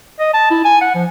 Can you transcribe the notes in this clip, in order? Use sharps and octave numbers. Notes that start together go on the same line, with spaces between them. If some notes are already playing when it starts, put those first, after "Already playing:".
D#5
A5
E4
G#5
F#5
F3